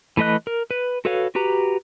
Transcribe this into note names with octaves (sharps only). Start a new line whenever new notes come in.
E3 A3 B4 D#5 F#6
A#4
B4
F#4 A4 B4 C#5 F5
F#4 G4 B4 A#5